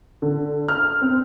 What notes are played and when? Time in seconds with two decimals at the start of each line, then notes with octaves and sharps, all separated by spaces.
0.22 D3
0.68 F6
1.02 C4